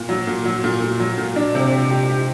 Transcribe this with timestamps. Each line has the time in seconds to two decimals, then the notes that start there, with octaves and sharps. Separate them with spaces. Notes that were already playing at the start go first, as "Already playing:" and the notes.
Already playing: A#2
0.09 F#3
0.27 A#2
0.45 F#3
0.64 A#2
0.82 A#2
1.00 F#3
1.18 A#2
1.36 D4
1.55 C3
1.73 G4
1.91 G4
2.09 G4